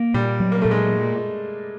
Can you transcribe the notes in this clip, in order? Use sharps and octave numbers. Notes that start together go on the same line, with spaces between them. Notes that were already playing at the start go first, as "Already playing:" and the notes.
Already playing: A#3
A#2 G3
F#3
A#3
A#2 A3
G#3